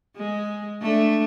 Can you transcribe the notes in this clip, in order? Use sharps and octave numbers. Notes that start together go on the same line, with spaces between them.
G#3
A3 D4